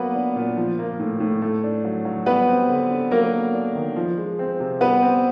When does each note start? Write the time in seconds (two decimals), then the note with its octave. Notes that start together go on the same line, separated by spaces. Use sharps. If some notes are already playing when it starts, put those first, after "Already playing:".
Already playing: F#3 A#3 B3 B4
0.15 D4
0.36 A#2
0.57 F3
0.79 A#3
1.00 A2
1.20 A2
1.41 A3
1.64 D4
1.85 F#3
2.05 F#3
2.26 G3 B3 B4
2.48 C4
2.69 D3
2.90 D3
3.11 F#3 A#3 A#4
3.33 B3
3.54 D4
3.75 D#3
3.96 F3
4.18 G#3
4.39 C4
4.60 C3
4.81 G3 B3 B4
5.02 C4